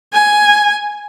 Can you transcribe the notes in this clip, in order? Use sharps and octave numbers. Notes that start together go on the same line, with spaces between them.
G#5